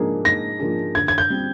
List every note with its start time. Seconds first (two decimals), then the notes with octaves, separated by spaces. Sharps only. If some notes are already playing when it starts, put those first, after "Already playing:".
Already playing: G#2 F3 A#3 D4 G#4
0.25 G#2 A#6
0.60 F3 A#3 D4 G#4
0.95 D3 G#6
1.08 G#6
1.18 G6
1.30 G3 C4